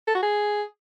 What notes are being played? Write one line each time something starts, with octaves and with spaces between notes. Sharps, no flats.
A4
F#4
G#4